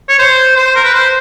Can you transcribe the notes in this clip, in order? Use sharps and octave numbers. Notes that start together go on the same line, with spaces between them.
C#5
C5
C5
A#4
B4
C5